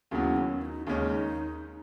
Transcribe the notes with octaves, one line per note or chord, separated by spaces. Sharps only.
D#2 C#3 F#3 B3 E4 F#4
C#4
E4
D#4
D#2 C#3 G#3 C#4 D#4